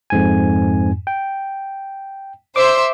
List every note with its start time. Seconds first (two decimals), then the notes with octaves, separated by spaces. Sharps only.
0.10 F2 G#2 G#5
1.07 G5
2.56 C5 E5 C6 D6